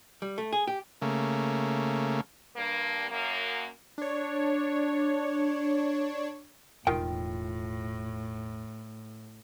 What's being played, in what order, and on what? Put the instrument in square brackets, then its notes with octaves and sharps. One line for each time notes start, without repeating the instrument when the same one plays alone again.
[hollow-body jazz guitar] G3
A3
G#4
G4
[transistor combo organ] C#3 A3 A#3
[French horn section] G2 A#3
F#2 A#3
[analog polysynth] D4 C#5
[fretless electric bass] E1 [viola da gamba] A2 [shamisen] D#3 [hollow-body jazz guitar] F4 G5